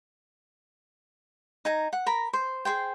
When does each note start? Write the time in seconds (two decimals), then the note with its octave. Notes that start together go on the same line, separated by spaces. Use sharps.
1.65 D#4 G#5 A#5
1.93 F#5
2.06 A#4 A#5 B5
2.33 C5
2.65 G#4 A4 C5 G5